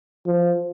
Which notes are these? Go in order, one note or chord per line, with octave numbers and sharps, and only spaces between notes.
F3